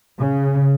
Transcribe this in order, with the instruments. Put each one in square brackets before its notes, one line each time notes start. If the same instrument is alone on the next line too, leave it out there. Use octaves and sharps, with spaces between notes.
[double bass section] C#3